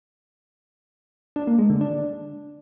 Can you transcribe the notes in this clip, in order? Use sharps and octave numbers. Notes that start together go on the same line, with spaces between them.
D4
A#3
G#3
D3
D4